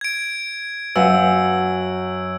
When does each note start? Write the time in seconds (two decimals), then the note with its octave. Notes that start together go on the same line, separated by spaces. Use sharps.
0.01 G#6 D7
0.96 F#2 B4 F5 F#5 E6